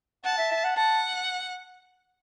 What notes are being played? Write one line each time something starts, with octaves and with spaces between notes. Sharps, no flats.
F#5 A5
E5
E5
F#5
F#5 A5